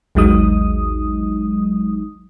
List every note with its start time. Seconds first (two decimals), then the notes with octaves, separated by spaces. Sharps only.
0.15 A1 D#2 F#3 G#3 D#4 D#6